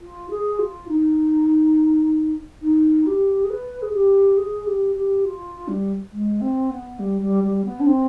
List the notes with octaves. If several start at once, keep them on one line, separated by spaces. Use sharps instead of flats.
F4
G#4
F4
D#4
D#4
G4
G#4
B4
G#4
G4
G#4
G4
G4
F4
G3
G#3
C4
B3
G3
G3
G3
B3
D4
C4